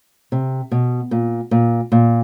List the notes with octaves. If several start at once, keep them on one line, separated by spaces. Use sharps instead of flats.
C3
B2
A#2
A#2
A#2